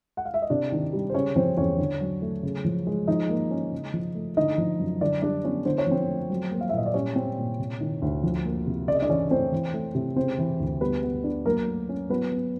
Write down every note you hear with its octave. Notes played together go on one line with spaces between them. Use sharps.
F#5
F5
E5
D#5
C3 D4 D5
D#3
G3
C5
C#3 C#4 C#5
F3 C4 C5
E2 C#4 C#5
D3
F#3
A3
C#3
F3
G#3
F3 D#4 D#5
A#3
C#4
C#3
F3
A3
D3 D#4 D#5
F3
F#2
D3 D4 D5
G3 D4 D5
B3 C#4 C#5
D3 C5
C#5
F3 C4 C5
A3
F#3
A#3
F5
E5
A#2 D#5
D5
G3 C#4 C#5
C4
A#2
C3
D#3
D2
F3
A#3
C3
C#3 D5
D#5
D4 D5
E3 C#4 C#5
A3 C4 C5
E3
A3
C3
C#3 C4 C5
E3
D2
G3 B3 B4
B3
D4
F#3 A#3 A#4
A3
C#4
F#3 B3 B4
B3